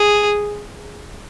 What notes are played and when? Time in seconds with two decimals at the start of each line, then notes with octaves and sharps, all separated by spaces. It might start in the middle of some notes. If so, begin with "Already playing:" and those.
Already playing: G#4